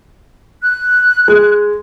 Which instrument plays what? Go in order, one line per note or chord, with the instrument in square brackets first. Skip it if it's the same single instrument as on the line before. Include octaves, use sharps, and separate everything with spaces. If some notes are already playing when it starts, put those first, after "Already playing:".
[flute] F#6
[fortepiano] G#3